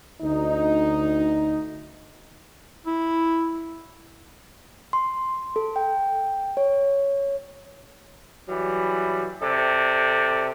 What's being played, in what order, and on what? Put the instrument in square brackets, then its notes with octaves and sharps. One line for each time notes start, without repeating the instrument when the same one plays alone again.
[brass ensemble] D2 D#4
[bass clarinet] E4
[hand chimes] C6
A4
G5
C#5
[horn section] E3 F#3 G3
C3 A4 D5